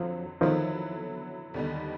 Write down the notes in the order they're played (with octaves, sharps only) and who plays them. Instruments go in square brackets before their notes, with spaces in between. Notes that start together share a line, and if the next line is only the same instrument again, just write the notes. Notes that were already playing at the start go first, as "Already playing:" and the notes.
Already playing: [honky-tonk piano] F2 D3 F#3 [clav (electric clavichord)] F3
[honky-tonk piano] D3 F#3 B3 E4 [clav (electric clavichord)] D#3 F3
[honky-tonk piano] D#2 D3 G3 B3 D#4